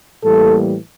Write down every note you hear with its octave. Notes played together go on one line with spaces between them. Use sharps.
A2 E3 G3 A#3 A4